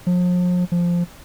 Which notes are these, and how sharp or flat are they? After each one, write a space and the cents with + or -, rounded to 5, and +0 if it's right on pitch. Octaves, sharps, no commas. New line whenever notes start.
F3 +40
F3 -5